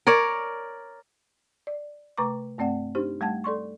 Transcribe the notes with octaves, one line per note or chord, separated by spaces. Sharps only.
A#4 C#5 D5
D5
C3 A3 B4 A#5 C#6 D6
G2 A3 C4 D5 F#5
D4 D#4 G4 C5
G3 A3 F#5 A5 G#6
A4 D5 C6 C#6